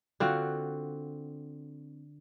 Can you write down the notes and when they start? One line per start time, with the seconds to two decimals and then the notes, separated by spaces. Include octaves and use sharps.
0.20 D3 C4 F4 F#4